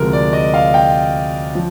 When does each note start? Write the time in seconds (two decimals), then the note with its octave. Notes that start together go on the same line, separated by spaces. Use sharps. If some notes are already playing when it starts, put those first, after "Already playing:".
Already playing: D2 C3 F3 G#3 A#4
0.13 D5
0.33 D#5
0.54 F5
0.74 G5
1.55 F3